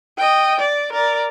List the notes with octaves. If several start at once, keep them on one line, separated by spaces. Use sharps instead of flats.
D#5 G5
D5
A#4 D5